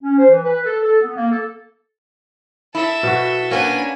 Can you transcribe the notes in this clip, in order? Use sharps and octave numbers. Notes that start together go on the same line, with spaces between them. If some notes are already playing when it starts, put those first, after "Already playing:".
C#4
C5
E3
B4
A4
A4
B3
A#3
A4
E4 A4 E5
B2 F#4
A#3 B3 C#4 D4 G#5